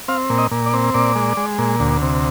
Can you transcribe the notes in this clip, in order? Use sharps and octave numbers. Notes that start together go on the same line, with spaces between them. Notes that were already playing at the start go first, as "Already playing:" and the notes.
C4 F5
A#2
D#5
A#2
D5
C4
A#2 D5
G#3
G#3
A#2
D2
C3